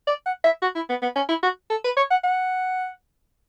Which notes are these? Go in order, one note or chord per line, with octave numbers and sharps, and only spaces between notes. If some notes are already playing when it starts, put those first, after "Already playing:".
D5
F#5
E5
F#4
E4
B3
B3
C#4
E4
F#4
A4
B4
C#5
F#5
F#5